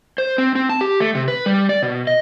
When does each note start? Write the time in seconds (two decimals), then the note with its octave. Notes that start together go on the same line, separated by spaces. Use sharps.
0.18 C5
0.38 C4
0.55 C4
0.69 A5
0.81 G4
1.00 A3
1.15 C3
1.28 B4
1.46 G3
1.69 D5
1.83 B2
2.07 D#5